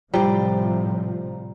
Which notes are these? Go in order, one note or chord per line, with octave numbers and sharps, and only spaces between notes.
A2 C3 F3 G3 F4 C5 A#5